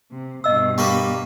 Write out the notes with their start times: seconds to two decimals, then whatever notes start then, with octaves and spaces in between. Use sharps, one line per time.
0.11 C3
0.44 G2 B2 D#5 E6
0.78 G3 A#3 B4 C#6